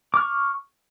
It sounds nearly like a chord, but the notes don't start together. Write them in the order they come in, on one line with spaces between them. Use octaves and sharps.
D6 F6 C#6